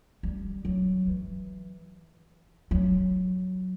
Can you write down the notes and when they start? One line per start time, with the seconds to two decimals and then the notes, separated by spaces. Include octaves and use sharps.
0.23 G3
0.65 F#3
1.07 E3
2.71 F#3